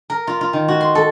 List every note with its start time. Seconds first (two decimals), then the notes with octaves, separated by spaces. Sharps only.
0.10 A#4
0.27 F4
0.41 F4
0.53 D#3
0.68 F#4
0.81 C6
0.95 A4